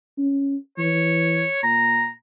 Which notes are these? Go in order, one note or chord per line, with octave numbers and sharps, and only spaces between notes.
C#4
E3 C#5
A#2 A#5